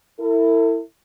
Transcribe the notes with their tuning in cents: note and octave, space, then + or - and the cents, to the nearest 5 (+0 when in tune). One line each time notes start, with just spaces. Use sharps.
E4 +0 A4 +45